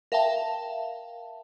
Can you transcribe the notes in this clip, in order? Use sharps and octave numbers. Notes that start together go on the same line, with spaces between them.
A#4 E5 F5 G5 A5